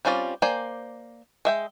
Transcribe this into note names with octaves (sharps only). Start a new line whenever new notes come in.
G3 C4 C#4 F4 D5
A#3 C5 D5 G5 G#5
G#3 E5 G5